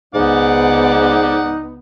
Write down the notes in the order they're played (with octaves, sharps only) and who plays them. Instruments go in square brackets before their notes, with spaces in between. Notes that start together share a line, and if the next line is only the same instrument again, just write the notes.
[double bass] C#2 B3 [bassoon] G#2 [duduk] D#4 [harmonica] D5 F#5 D6